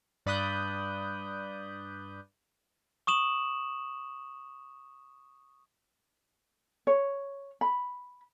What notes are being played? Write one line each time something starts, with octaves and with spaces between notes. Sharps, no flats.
G2 D5 B5 D#6 F#6 G6
C#6 D#6 E7 F#7
C#5
B5